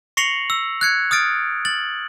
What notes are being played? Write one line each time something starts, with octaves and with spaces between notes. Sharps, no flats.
C#6 A#6 C7 C#7 F7 F#7
E6
F#6 G#6 C#7
D#6 F6 A6 D7
A6 F#7